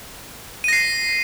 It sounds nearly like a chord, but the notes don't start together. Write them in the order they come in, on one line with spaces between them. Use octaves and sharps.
D#7 A#6 C7